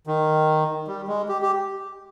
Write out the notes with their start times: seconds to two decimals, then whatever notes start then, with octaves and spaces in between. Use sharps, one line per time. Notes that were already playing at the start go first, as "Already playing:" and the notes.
0.07 D#3
0.87 G3
1.08 G#3
1.28 G4
1.42 G4